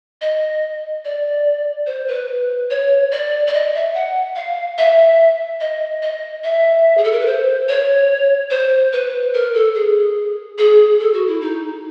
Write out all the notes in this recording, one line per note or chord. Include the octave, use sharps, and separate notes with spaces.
D#5
D5
C5
B4
C#5
D5
D5
D#5
E5
F#5
F5
E5
D#5
D#5
E5
G#4
A4
A#4
B4
C5
C#5
C5
B4
A#4
A4
G#4
G#4
A4
F#4
E4
D#4